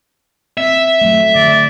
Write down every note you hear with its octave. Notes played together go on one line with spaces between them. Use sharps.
C4 E5
F#3 A3
D3 F3 D5